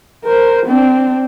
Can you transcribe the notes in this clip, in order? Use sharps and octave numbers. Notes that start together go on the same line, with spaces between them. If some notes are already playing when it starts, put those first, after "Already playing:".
A#4 C5
C4 D4